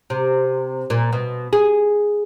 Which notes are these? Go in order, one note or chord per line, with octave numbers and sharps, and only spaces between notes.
C3
A#2
B2
G#4